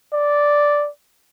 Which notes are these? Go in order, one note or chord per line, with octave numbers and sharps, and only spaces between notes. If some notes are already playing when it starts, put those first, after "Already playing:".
D5